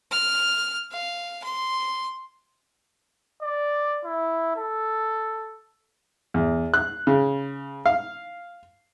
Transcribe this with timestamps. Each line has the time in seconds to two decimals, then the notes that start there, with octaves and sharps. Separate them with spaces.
0.11 F6
0.91 F5
1.43 C6
3.42 D5
4.05 E4
4.57 A4
6.34 E2
6.74 F#6
7.07 C#3
7.86 F5